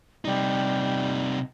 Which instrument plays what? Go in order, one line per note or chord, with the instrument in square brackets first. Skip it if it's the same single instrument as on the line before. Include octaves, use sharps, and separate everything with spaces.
[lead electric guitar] C3 D#4 [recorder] G3